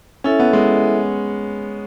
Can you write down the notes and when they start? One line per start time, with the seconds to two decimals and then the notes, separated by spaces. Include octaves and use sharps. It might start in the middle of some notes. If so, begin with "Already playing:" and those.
0.24 C#4 E4 A4 E5
0.40 B3
0.53 G#3